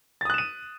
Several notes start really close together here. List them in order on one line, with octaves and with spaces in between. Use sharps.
A6 D#6 F#6 E7 D#7